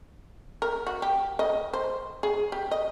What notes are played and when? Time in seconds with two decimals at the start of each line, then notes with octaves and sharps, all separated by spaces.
0.62 A#4
0.87 F#4
1.02 G4
1.39 D#5
1.73 C5
2.23 G#4
2.52 G4
2.71 D#5